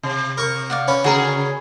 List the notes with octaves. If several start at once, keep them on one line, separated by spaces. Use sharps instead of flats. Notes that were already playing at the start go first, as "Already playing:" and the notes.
C3
A#4 C#6
D5 F5 F#5
C#4 B4
C#3 F#4 G#4 A#4 C#5